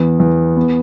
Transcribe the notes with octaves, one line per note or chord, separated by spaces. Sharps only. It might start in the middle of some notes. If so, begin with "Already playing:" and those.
Already playing: E2 B3
E2
B3